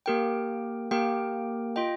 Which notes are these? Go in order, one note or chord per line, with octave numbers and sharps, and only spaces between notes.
A#3 G4 A#4 G5
A#3 G4 A#4 G5
F4 D#5 G5